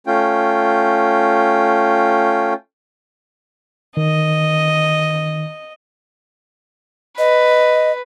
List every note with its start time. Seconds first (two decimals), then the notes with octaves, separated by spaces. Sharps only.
0.07 A3 C#4 F4 G5
3.97 D#3 D#5
7.19 B4 D#5